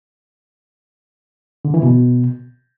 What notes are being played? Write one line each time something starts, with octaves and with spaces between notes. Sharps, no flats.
D3
E3
B2